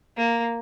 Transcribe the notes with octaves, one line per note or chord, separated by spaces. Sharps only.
A#3